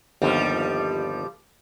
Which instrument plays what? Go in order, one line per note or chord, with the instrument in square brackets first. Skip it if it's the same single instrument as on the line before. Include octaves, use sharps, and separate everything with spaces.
[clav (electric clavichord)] G1 D#2 [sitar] F3 G3